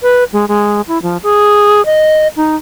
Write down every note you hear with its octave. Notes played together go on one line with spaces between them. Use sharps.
B4
G#3
G#3
E4
F3
G#4
D#5
D#4